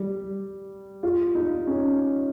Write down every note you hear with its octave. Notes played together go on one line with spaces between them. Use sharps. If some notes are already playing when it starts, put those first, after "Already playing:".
Already playing: G3
F4
D#4
C#4